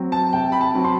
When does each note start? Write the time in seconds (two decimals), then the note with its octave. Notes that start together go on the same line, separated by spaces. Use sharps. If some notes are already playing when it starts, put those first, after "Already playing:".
Already playing: F#3 C4
0.12 A5
0.33 C3 G5
0.52 B5
0.61 A5
0.75 F#3 C4
0.84 C6